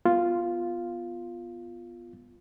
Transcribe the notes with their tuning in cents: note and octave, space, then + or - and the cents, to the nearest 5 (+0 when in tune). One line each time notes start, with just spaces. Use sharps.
B3 +0 F4 +0